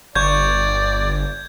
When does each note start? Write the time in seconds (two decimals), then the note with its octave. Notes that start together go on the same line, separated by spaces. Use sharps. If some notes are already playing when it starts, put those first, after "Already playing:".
0.15 G1 D5 C#6 G6 G#6